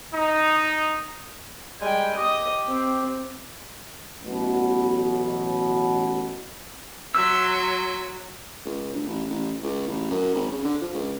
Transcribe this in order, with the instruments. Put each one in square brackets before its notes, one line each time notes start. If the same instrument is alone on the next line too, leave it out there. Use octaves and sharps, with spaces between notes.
[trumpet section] D#4
[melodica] G3 G#3 [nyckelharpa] G5 G#5
[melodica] G4 [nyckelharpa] D#5 D#6
[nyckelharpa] C4
[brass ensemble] A1 B2 F#3
[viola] F#3 [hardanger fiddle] E5 C6 [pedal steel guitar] E6
[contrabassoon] C#2
D2
A1
A1
C#2
A1
F#2
G#1
C#3
D3
F3
C#2